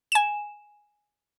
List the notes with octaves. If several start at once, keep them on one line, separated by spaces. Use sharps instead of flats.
G#5 E7